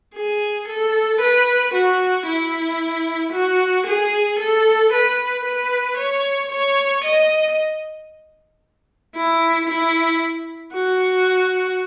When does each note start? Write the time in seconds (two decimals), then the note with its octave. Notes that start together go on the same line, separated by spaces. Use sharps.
0.15 G#4
0.68 A4
1.21 B4
1.74 F#4
2.27 E4
3.33 F#4
3.87 G#4
4.39 A4
4.92 B4
5.45 B4
5.97 C#5
6.51 C#5
7.04 D#5
9.15 E4
9.69 E4
10.74 F#4